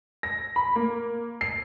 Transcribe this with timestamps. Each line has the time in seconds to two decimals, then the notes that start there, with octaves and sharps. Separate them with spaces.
0.23 A#6
0.56 B5
0.76 A#3
1.41 C7